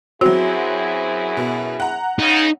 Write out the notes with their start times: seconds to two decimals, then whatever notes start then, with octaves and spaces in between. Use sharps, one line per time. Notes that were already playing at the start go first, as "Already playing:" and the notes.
0.21 F#2 F#3 C4 E4 F#4 G#4
1.37 B2
1.80 F#5 A#5
2.19 C#3 D#4